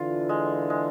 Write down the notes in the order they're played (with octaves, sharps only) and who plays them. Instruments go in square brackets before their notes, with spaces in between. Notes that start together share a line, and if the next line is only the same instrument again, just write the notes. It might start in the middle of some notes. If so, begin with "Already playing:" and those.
Already playing: [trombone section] D3 E3 [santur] F4
[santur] G#3
G#3